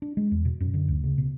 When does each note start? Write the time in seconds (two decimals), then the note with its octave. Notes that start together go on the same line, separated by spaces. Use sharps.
0.02 D4
0.17 G#3
0.31 E2
0.45 B2
0.60 F#2
0.74 D3
0.88 D2
1.04 C#3
1.18 B2